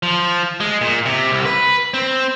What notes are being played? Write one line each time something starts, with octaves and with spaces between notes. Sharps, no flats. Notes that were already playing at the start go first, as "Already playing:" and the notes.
F3
G#3
A#2
C3
C2
B4
C4